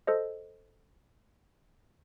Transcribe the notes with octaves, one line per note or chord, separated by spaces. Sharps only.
A4 C5 D#5